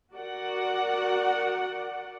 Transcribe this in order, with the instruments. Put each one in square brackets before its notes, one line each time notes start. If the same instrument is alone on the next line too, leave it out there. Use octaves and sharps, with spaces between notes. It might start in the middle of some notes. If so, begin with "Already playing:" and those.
[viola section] F#4 A#4 D5 F#5